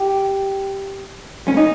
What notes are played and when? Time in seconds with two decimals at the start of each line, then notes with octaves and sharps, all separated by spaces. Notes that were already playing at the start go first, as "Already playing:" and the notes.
Already playing: G4
1.48 C#4
1.57 D#4